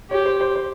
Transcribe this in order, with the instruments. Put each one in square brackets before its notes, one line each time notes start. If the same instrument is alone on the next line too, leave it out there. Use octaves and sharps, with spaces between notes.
[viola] G4 [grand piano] C#5
[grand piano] C5
C5
C5